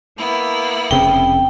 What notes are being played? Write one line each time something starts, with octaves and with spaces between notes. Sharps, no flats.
A#3 B3 E4
F1 C#3 C4 G5